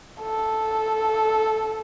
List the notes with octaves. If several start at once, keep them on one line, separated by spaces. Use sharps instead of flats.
A4